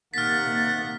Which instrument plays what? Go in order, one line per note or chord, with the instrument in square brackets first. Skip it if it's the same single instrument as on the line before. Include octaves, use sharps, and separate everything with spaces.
[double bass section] C3 A#3 [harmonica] D#3 F#5 [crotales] F6 B6 [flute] A6